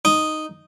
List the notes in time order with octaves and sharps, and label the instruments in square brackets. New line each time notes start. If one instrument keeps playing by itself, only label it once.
[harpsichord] D#4